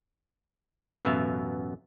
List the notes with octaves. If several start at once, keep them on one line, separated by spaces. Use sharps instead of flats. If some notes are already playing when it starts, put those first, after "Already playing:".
A1 F#2 B2 B3 E5 F5